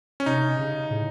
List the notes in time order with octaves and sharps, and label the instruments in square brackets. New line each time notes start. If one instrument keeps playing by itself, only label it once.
[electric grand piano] C#4
[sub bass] C3 [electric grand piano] D#4
[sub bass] C#3
A2